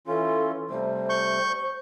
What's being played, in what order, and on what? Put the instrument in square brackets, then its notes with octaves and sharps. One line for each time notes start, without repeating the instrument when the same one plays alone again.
[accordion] E3 C#4 F4 [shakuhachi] A4
[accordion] C3 G3 A3 [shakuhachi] C5
[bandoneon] C#6 G6